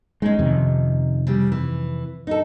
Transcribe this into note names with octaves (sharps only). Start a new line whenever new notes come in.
G#3 C#4 D#4
F2 C3 D#3
C#3 G3 C4
E3
D#4 A4